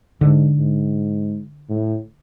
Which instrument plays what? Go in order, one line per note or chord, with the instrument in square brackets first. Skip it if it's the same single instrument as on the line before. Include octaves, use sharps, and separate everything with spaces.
[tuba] G#2 [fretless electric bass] D3
[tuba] G#2
A2